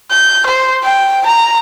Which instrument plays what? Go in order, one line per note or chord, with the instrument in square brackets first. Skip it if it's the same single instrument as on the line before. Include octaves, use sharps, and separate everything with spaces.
[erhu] G6
C5
G5
A#5